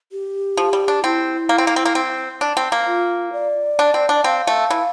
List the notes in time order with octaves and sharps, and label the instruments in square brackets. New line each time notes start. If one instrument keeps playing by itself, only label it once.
[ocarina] G4
[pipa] F3
G3
D4
[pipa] C4 [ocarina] E4
[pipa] A#3
C4
A#3
C4
A#3
C4
D4
C4
A#3
[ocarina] F4
D5
[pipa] D4
C4
D4
[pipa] C4 [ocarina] F5
[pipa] A3
E3